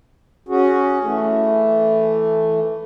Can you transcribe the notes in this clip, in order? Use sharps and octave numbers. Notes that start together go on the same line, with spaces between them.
C#4 F#4 G#4
E3 A3